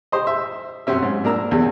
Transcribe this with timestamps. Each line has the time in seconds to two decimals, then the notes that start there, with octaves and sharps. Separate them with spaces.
0.12 G4 C5 D#5
0.27 E5
0.87 F#2 C3 C4 C#4 E5
1.03 G#2
1.24 A#2 D4 A#4 A#5 E6
1.51 E2 C#3 G3